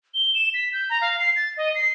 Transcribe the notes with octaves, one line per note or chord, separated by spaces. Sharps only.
G7
E7
B6
G6
A#5
F5
C7
A6
D#5
C7